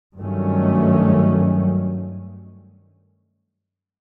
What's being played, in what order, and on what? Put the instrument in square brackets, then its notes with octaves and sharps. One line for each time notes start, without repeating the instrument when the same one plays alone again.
[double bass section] G2 D#3 F#3 A3 C#4